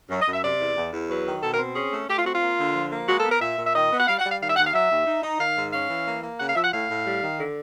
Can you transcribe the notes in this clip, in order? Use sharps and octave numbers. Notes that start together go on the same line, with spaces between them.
F#2
D#5
F#2
E5
C3 D5
E2
E2
E2
F#3 B4
D#3
B2 A4
A#4
C4
C#4 G#4
A3
A3 G4
F4
C4 F#4
F4
A#3
D3
F3
A#3
G#3 F#4
A4
B3
A#4
A#2 E5
A#2
E5
D#3 D#5
B3
F#5
G3 F5
F#5
G3
F5
D#3 F5
E5
D#2 F#5
F5
F#3 E5
D#2
D#4
D#4
D#3 F5
G#2
C#4 F5
E3
A#3
A#3
C#3 F#5
F5
F3 E5
F#5
A2 F5
A2
G3
D#3
D3